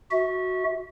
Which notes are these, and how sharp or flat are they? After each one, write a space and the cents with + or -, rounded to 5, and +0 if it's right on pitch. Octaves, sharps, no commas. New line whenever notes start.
F#4 +0 E5 -30